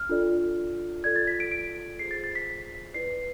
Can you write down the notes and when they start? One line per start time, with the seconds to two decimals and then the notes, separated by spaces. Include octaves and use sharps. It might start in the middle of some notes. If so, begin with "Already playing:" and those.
Already playing: F6
0.09 D4 F4 A4 D5
1.04 F4 A4 D5 G#6
1.16 A6
1.27 B6
1.40 D7
1.52 D7
1.99 F4 G#4 C5 C7
2.11 A6
2.24 A6
2.35 B6
2.94 E4 B4 D5 C7